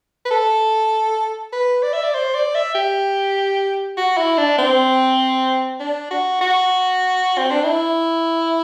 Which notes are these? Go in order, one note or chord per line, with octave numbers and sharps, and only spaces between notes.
B4
A4
B4
D5
E5
D5
C5
D5
E5
G4
F#4
E4
D4
C4
D4
F#4
F#4
C4
D4
E4